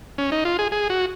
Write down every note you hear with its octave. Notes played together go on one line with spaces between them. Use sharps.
C#4
D#4
F4
G#4
G#4
F#4